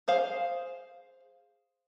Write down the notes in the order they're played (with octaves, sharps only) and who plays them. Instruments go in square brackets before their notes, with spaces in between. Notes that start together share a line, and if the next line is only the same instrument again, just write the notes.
[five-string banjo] G#4 C5 F5